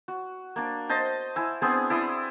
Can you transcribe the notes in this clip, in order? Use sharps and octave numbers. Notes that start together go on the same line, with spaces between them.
F#4
A#3 D4
C5 D#5 A5 C6
E4 G#5 E6
B3 C4 D4 G#4
E4 D5 C6 D#6